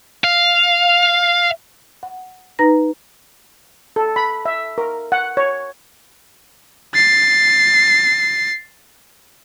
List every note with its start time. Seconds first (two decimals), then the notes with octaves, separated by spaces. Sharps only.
0.24 F5
2.03 F#5
2.59 D#4 B4 A#5 A#6
3.96 A4
4.16 B5
4.46 E5
4.78 A#4
5.12 F#5
5.37 C#5
6.94 A6 C7